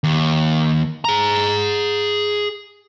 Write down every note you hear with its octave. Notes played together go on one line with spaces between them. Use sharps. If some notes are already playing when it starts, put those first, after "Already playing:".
D#2
G#4 A#5